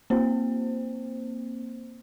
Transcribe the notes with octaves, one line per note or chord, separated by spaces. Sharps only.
A#3 C4 C5